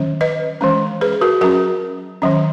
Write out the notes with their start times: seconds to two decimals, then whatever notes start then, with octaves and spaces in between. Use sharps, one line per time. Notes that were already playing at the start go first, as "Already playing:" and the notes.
Already playing: D#3 F#3 C#4
0.21 B4 D#5
0.61 E3 G#3 C#4
1.01 G#4 B4
1.21 F#4 A#4
1.41 F#3 C#4 F#4 A#4
2.22 D#3 F#3 C#4